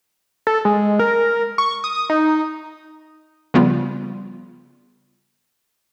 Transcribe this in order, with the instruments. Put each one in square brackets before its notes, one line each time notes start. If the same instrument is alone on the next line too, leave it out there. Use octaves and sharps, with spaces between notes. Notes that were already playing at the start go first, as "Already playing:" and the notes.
[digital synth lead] A4
G#3
A#4
C#6
D#6
D#4
[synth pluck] C#3 F3 G3 B3 F4